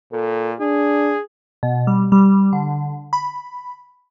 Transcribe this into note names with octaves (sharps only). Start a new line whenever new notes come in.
A#2 A4
D4 G#4
B2
G3
G3
D3
B5